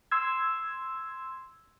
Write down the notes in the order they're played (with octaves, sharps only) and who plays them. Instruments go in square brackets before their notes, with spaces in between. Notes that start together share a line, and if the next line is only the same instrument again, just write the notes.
[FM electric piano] C6 E6 G#6